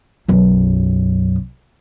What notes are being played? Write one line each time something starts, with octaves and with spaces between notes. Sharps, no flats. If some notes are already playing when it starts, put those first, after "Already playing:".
B1 F#2